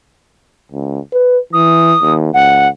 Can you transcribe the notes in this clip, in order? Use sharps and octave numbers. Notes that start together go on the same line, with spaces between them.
C#2
B4
E3 D#6
D#2
C#2 F#5